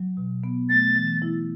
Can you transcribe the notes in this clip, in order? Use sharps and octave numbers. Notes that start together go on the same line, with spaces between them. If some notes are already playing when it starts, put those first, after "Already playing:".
Already playing: F#3
B2
B3
A3 A6
E3
E4